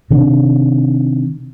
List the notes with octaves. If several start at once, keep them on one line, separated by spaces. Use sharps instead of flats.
C3 D#3 D4